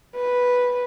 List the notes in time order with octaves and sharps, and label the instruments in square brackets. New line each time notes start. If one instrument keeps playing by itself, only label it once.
[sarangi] B4